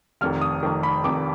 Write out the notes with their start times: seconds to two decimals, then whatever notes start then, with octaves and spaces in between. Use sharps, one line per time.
0.21 F1 F2 D#3 F6
0.41 D#6
0.63 F1 F2 D#3
0.83 B5
1.04 F1 F2 D#3 D6